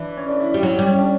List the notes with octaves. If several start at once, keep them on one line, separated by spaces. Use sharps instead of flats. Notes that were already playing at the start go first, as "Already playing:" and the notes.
Already playing: E3 D4
C#4
D4
E4
D4
G3
F#3 E4
C#4
G3
C#4
D4